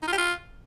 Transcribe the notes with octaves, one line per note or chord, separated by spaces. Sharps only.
D#4
F4
G4
F4